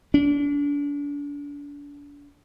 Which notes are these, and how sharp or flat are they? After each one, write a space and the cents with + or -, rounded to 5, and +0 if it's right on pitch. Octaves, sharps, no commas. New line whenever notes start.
D4 -35